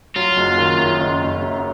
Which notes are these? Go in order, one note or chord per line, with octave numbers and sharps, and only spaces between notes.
F#3 F4
F#1
D#3
F#2
F#1
F#1
F#2